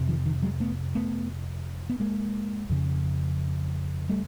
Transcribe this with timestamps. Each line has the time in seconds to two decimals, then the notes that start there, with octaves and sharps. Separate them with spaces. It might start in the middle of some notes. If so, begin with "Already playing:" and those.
Already playing: F2 C3
0.08 D#3 F3
0.26 D#3
0.42 F#3 G#3
0.60 A3 B3
0.95 A3 B3
1.90 B3
2.00 G#3 A#3
2.70 F2 C#3
4.09 G3 A3